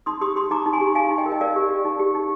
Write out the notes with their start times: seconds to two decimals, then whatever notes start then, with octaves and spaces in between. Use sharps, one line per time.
0.06 D#4 C6 D#6
0.21 G4 C6 D#6
0.36 G4 C6 D#6
0.51 D#4 A#5 D6
0.66 D#4
0.73 G#5 C6
0.81 G4
0.95 D#4 F5 G#5
1.11 D#4
1.18 D#5 G5
1.26 A#4
1.32 D#5
1.41 A#4 D5 F5
1.56 G4
1.71 G4
1.85 D#4
2.00 G4
2.15 D#4